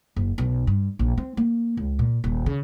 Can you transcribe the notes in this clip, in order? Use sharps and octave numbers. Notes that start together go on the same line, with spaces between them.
F#1
B1
G2
A#1
C4
A#3
C#2
A#2
D#1
C#3